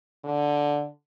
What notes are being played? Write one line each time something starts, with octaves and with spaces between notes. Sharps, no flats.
D3